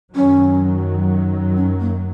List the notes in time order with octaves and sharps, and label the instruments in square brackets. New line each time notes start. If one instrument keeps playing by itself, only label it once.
[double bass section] F#2 D#3 F#3 [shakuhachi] C#4
[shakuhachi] C#4
A#3